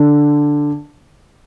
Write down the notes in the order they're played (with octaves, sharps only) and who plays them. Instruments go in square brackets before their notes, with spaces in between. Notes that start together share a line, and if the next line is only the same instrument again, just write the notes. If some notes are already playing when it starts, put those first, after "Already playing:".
Already playing: [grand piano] D3